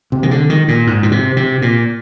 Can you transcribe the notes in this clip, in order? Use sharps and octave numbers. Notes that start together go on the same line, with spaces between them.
C3
D#3
D3
D#3
A#2
G#2
A#2
C3
C3
A#2